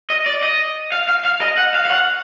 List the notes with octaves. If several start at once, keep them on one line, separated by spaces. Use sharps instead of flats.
D#5
D5
D#5
F5
F5
F5
D#5
F#5
F5
F5
F#5